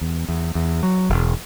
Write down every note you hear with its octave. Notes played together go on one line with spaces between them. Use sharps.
E2
E2
E2
F#3
E1